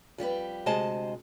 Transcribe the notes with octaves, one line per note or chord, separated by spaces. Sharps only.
F2 G3 G4 B4
D2 C3 G#3 C5 D#5 A5